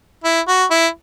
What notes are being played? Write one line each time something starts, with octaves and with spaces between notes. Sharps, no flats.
E4
F#4
E4